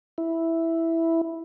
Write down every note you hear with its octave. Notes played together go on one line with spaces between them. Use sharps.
E4